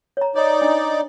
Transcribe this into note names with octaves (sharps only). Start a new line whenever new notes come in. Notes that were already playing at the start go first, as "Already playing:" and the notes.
C#5 A#5
D#4 C#5 D5 A#5
D4